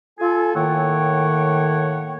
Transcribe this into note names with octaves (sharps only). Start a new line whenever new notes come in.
F4 A4 G#5
A2 D#3 A#3 C#5 F#5 G5